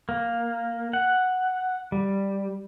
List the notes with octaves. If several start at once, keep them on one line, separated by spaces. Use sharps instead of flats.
A#3
F#5
G3